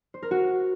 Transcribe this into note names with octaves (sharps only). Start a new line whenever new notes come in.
C5
A#4
F#4